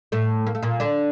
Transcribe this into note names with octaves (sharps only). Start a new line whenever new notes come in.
A2 A3
A#3
A3
A#2 A#3
D3 D4